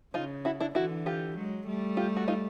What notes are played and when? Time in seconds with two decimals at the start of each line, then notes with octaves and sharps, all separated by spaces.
0.14 C#3 D#4 F4
0.45 E4 F#4
0.60 D4 E4
0.75 D3 E3 E4 F#4
1.06 F4 G4
1.36 F#3 G#3
1.67 G3 A3
1.97 F4 G4
2.17 F#4
2.28 D#4 F4